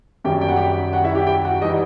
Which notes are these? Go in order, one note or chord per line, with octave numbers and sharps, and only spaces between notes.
F#2 D#3 G3 G4 G5
G5
F#5
G4 G5
F#4 F#5
E4 E5
G4 G5
G4 G5
F#4 F#5
E3 G3 D#4 D#5